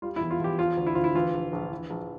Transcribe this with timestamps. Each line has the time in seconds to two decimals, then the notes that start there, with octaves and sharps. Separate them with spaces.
0.02 G3 F4
0.16 E4
0.21 E2
0.30 F4
0.40 E2 G4
0.58 F3 F4
0.77 D2
0.87 E4
0.95 D2 F4
1.04 E4
1.15 E3 F4
1.34 A#1
1.52 A#1
1.71 E3
1.90 A#1